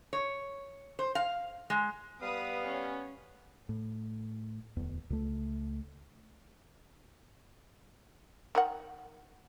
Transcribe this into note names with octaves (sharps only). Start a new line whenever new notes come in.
C#5
C5
F5
G#3
G3 B3 B4 F5 D#6
C#4
A2
D1 E2
C#2 A3
D#3 A#4 F#5